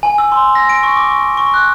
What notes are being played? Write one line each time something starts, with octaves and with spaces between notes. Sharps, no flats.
G#5
E6
C6
A#6
D7
C#6
D6
C#6
C#6
F#6